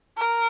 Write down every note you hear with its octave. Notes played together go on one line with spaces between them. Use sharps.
A#4